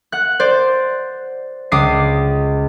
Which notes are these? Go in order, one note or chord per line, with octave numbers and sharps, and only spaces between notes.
F#5 F#6
C5 D5
C#2 D6 D#6 C7